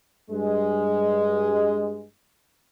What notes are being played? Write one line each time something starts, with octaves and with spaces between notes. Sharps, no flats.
G2 G#3